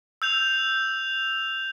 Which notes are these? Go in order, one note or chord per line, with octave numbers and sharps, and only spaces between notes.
E6 G6 F7